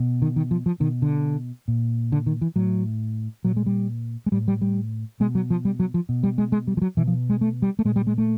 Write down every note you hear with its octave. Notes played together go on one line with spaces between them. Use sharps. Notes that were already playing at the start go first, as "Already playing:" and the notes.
Already playing: B2
D#3
D#3
F3
F3
B2 D#3
D3
A#2
D3
D#3
E3
A2 F#3
A#2 F#3
G#3
G3
G#3
A2 G3
G3
G3
B2 G#3
F#3
F3
G3
F#3
F3
B2
G3
G#3
G#3
G3
F3
F#3
B2 E3
F3
G#3
A3
G3
A3
A#2 G#3
G3
G#3
A3